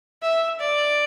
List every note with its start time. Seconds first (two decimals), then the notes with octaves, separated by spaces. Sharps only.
0.22 E5
0.60 D5